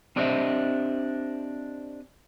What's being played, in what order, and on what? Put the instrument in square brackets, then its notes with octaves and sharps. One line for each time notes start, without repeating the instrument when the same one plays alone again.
[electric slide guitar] C4 D4 G4 C5 D#5 E5